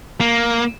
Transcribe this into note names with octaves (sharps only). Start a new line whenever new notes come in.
A#3